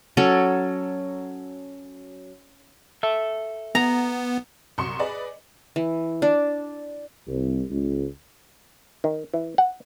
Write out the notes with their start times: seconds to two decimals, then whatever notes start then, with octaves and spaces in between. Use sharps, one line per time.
0.17 F#3 C#4 A4
3.03 A4 E5
3.75 B3 A#5
4.78 C2 F#3 C6 C#6 C#7
4.99 G#4 B4 D5 D#5
5.76 E3
6.22 D4
7.28 C2
7.71 C#2
9.04 D#3
9.34 E3
9.58 F#5